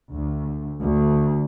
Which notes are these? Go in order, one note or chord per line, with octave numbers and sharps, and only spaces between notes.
D2
D2